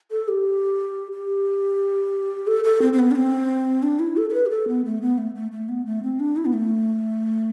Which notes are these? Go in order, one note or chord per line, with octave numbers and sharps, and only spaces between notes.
A4
G4
G4
A4
A4
C4
C4
B3
D4
C4
D4
E4
A4
A4
B4
G4
A4
B3
A3
B3
A3
A3
A3
B3
A3
C4
D4
E4
B3
A3